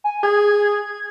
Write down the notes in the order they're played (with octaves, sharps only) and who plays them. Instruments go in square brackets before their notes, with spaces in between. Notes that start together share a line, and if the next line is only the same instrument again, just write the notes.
[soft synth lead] G#5
[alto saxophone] G#4 [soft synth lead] G#6